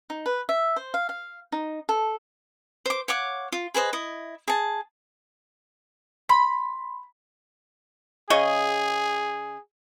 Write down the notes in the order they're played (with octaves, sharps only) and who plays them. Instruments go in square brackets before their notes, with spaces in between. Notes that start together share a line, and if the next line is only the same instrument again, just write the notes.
[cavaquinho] D#4
B4
E5
C5
F5
F5
D#4
A4
C5 D6
C#5 F5 F#5 D6
F4
G#4 B4 C5 D#5
E4 D#5
G#4 A5
[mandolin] B5 [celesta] C6
[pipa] C#3 D#5 C#6 [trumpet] G#4